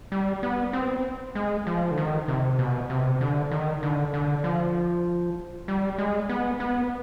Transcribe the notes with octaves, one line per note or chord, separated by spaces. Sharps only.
G3
B3
C4
G#3
F3
D3
D#3
C3
B2
C3
D3
D#3
D3
D3
F3
G3
G#3
B3
B3